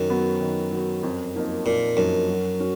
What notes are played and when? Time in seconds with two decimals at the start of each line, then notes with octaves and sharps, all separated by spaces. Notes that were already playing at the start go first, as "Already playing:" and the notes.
Already playing: F#2 D#3
0.10 F#3 B3
0.41 D#3
0.72 F#3
0.77 B3
1.03 F2
1.35 F3 A#3 D#4
1.66 F2 A#2
1.97 F#2 F3 A#3 D#4
2.29 F#3
2.59 C#4 F#4